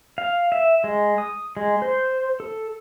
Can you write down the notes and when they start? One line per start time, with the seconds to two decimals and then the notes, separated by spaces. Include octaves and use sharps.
0.18 F5
0.52 E5
0.84 G#3
1.18 D#6
1.57 G#3
1.82 C5
2.40 A4